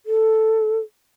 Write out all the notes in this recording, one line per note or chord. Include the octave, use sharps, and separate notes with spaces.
A4